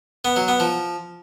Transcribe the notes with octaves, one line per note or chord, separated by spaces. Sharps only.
B3
F#3
B3
F3